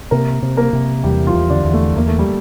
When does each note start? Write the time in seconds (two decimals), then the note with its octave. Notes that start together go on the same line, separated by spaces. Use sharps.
0.11 C3 A#3 A#4
0.42 C3
0.57 A#3 A#4
0.73 C3
1.04 E2 G3 G4
1.27 F3 F4
1.34 E2
1.50 D3 D4
1.65 E2
1.73 A3
1.96 E2 A#3
2.07 A3
2.19 G3